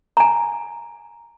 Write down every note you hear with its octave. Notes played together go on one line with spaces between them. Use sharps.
G#5 A#5